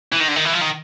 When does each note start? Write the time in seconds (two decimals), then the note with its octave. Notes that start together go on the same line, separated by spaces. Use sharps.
0.13 E3
0.20 D#3
0.28 D3
0.36 D#3
0.45 E3
0.53 F3
0.61 D#3